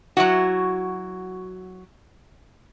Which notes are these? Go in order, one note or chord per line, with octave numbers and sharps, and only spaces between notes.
F#3 E4 F#4